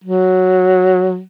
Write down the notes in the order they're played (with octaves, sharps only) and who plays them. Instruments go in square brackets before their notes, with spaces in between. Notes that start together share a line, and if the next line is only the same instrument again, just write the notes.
[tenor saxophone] F#3